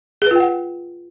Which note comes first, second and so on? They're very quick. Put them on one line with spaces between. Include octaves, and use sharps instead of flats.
G#4 B4 F4 G5 F#5